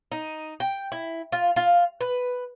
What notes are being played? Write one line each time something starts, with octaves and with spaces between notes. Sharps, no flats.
D#4
G5
E4
F4
F4
B4